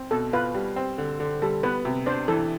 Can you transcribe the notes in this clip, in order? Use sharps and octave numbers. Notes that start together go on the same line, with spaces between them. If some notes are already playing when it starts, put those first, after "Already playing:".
Already playing: C4
B2 A4
F4 B4
G3
C4
D3
D3
G3 A4
B3 B4
C3
D4 C5
E3 A4